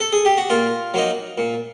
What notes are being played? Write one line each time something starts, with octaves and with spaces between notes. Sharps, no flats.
A4
G#4
G4
F#4
A#2 F4
F#3 A#3 D#4
A#2